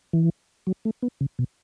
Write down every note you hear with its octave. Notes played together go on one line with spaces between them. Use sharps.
E3
F#3
A3
B3
C#3
B2